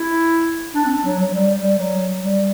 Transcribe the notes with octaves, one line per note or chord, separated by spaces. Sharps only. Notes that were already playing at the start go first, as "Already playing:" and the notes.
Already playing: E4
D4
C4
D4
F#3
F#3
G3
G3
F#3
G3